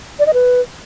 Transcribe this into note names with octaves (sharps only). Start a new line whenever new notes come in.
D5
D#5
B4